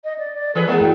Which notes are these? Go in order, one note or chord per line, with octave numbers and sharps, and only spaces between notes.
D#5
D5
D5
E3 G#4 A4 B4
G#3 B3 A#4 D5 F#5
A1 F#4 G5